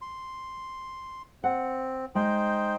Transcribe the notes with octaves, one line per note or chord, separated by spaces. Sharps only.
C6
C4 F#5
G#3 D#4 C5 G5